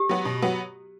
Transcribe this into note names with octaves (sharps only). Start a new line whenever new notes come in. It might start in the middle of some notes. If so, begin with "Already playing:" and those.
Already playing: G4
F#3 B3 F#4
B2
F#3 B3 F#4